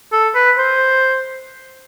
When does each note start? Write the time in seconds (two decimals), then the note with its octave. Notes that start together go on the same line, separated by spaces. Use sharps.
0.12 A4
0.35 B4
0.58 C5